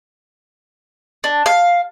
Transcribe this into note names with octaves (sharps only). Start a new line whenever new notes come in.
D4
F5